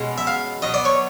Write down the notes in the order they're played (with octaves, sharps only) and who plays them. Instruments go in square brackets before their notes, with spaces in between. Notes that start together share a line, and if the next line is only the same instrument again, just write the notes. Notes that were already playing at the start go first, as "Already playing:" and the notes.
Already playing: [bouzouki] B2 G#3 C#4
[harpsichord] E5
F5
[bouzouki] B2 F#3 B3 [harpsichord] D#5
[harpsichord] D5
C#5